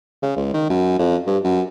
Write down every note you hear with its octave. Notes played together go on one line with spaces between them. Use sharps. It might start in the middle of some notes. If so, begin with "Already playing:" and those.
C#3
C#2
D#3
F#2
F2
G2
F#2